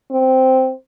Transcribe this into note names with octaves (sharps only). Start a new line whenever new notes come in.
C4